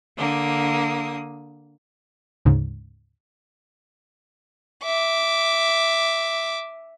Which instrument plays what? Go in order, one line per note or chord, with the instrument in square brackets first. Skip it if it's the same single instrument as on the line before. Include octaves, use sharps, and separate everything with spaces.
[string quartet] D3 A#3 D#6
[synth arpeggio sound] D2 G#2 C#3
[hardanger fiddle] E5 D6